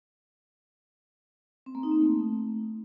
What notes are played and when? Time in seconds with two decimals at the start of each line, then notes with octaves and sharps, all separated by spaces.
1.66 C4
1.75 A#3
1.83 D#4
1.92 C4
2.00 A3